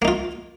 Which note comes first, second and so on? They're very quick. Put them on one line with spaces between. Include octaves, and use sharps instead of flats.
A#3 D#4 F4